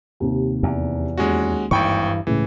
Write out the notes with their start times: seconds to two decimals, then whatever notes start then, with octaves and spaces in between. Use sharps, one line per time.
0.20 D#2 C3
0.63 E2
1.18 D#2 G#3 C#4 F#4
1.71 G#1 G2 E3 G5 C#6
2.27 C#2 A2 E3